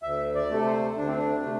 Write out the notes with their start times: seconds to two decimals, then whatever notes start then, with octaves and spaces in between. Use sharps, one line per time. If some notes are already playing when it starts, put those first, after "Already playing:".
0.03 D2 E5
0.35 D5
0.50 C3 A3 A4
0.66 C5
0.96 D2 D4
1.08 C4
1.17 D4
1.43 C3 A3